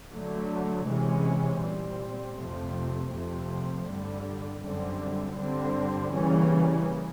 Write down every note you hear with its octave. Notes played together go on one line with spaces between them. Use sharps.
D3 F#3 A3
C3 E3 G#3 C#4
A#2 G3 C4
F2 C3 F3 A3 C4
F2 C3 F3 A3 C4
G2 D3 G3
F#2 D3 G3 C4
G2 D3 G3 C4
C#3 E3 G3 A#3 C#4